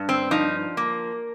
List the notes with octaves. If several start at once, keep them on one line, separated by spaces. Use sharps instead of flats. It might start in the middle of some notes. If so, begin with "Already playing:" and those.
Already playing: G2
C4
F3 D#4
A#3